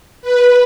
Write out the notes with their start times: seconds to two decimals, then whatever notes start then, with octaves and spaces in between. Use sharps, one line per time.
0.22 B4